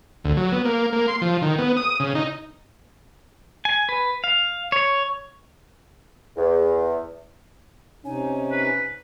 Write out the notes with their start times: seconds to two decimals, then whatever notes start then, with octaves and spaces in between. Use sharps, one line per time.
0.24 D2
0.37 F#3
0.52 B3
0.65 A#3
0.93 A#3
1.08 C6
1.21 F3
1.42 D#3
1.58 B3
1.77 D#6
2.00 C#3
2.15 D#4
3.65 G#5
3.89 B4
4.24 F5
4.72 C#5
6.37 E2
8.05 C3 C#4 D#4 G#5
8.52 B4